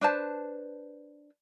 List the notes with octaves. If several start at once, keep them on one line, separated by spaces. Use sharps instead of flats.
D4 B4 C5 A5